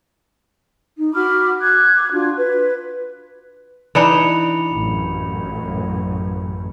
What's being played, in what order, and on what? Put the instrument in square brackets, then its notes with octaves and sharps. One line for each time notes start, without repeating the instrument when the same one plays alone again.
[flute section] D#4
F#4 B5 D6 F6
D6 F#6 G#6
D4 F4 F#4
B4
[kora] E3 D4 D#4 [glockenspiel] B5 C#7 F7
[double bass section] A1 F#2